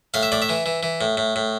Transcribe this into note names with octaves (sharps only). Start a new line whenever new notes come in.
A2 F5
E5
A2 D5
E5
E3
E3
E3
A2
A2
A2